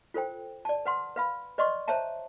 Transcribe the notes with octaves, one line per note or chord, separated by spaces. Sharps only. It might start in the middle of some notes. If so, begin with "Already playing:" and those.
F4 A4 C5 G5
D5 A5
B4 F#5 C6
B4 F5 B5
B4 D5 D#5 C6 C#6
C5 C#5 E5 A5 A#5